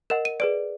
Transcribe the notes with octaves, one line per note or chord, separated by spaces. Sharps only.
A#4 D#5 F#5 E7
D#7
G#4 B4 D5 D7